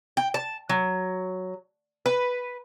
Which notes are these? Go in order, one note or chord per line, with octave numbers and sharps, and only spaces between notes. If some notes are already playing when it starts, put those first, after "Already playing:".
G5
A5
F#3
B4